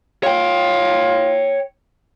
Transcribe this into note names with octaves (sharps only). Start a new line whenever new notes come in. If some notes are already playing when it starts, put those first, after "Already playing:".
F4 C#5 G5